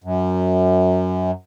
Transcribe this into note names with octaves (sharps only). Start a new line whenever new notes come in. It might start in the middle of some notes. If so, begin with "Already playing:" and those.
F#2